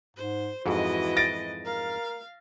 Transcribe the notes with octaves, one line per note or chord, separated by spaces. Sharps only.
G#2 C5
F2 G#2 E3 F#4 D#5
A6 A#6 D7
A#4 F5